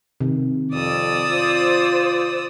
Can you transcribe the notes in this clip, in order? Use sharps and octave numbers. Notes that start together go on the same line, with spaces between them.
C3 D#3
F2 D5 D#6 E6
F4 C5